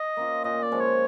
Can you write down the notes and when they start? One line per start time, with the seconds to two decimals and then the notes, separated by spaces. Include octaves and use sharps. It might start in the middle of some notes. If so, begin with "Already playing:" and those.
Already playing: D#5
0.17 A#3 C#4 F4
0.44 A#2 D#5
0.62 D5
0.72 F3 G#3 C#4
0.80 C#5